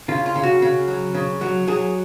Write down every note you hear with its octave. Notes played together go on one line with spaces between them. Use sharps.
C#3 F4
F4
C#3
F#4
C#3
F#3
C#3
F#3
F#3 G#4